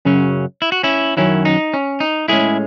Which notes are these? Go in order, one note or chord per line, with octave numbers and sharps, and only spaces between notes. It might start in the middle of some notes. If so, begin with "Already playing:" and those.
F#2 C#3 F#3 C#4
E4
F#4
C#4 E4
F#2 D#3 F#3 C#4 E4
D#4
C#4
D#4
A2 G#3 C#4 E4 G#4